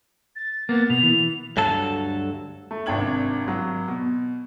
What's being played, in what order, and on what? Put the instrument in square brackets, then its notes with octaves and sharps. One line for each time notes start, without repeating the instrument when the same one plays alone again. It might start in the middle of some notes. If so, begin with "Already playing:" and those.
[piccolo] A6
[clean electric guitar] A#3 B3 [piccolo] A6
[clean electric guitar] B2 [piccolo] F7
[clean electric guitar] E3
D2 G2 F#3 A4 A5
[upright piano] A3
G#1 C3 D4 G5 G#6 F#7
G#1 F#3
B2